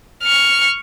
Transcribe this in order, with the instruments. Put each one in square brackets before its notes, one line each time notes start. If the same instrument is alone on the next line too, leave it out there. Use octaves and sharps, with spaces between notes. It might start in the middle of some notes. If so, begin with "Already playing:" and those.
[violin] C#6 F6